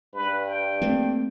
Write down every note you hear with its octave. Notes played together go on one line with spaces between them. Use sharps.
G2 B4
G5
A3 A#3 C4